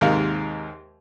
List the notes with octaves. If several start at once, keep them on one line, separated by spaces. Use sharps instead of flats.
D#2 G#2 C3 A#4 D#5 F5